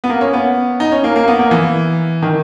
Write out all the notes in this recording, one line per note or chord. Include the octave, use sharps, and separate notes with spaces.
B3
A#3
C#4
B3
D#4
C#4
A#3
A#3
B3
A#3
E3
D#3